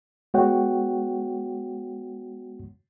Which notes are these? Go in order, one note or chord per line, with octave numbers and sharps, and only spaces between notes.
G#3 B3 F#4 C#5 F#5 G5